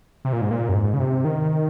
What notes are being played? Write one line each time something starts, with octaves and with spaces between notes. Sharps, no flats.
C3
A#2
G#2
A#2
F#2
G#2
C#3
C3
D#3